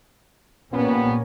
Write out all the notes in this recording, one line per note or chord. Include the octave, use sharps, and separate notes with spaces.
A#2 F3 G3 A#3 B3 C#4